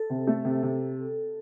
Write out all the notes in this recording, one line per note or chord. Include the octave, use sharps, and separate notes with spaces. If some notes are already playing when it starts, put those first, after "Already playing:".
Already playing: A4
C3
A3
C3
C3